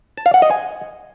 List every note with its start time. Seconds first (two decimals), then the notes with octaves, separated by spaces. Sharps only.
0.17 A5
0.26 F5
0.34 F#5
0.42 D#5
0.50 G#5